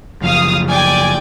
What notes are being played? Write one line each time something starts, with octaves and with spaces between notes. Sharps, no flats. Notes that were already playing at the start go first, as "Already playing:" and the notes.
F#1 F3 F5 D#6
D5 G5 G#5